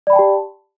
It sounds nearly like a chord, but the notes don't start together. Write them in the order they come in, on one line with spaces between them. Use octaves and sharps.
D5 B5 G5 A5 G4